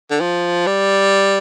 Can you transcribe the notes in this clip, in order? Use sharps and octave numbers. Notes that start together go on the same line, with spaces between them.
D3
F3
G3